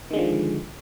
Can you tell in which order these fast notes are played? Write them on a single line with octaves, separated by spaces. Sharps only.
D#3 G#3 D3 F3